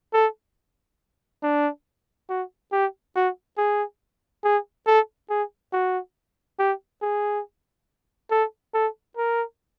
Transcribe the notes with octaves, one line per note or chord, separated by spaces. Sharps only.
A4
D4
F#4
G4
F#4
G#4
G#4
A4
G#4
F#4
G4
G#4
A4
A4
A#4